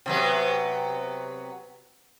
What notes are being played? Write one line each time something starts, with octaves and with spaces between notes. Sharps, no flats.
C3 F#3 B3